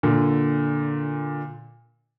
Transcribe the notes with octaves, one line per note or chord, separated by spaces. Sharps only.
A#2 D3